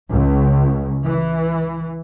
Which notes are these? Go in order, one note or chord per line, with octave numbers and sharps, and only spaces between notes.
C#2
E3